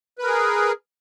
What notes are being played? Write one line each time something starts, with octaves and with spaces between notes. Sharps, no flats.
G#4 A#4 B4